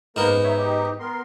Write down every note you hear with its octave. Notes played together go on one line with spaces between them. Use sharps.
G#2 A#3 B3 A#4
F#2
D#4 C#5 E5
D#4 G4
B3 A#4 C6